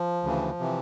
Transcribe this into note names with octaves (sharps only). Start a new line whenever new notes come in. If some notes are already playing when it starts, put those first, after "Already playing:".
Already playing: F3
D2 C#3 E3
C3 E3